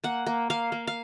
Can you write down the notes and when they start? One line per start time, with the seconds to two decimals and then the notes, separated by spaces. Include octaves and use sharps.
0.04 A#3 F#5
0.26 A#3
0.50 A#3 F5
0.72 A#3
0.87 F5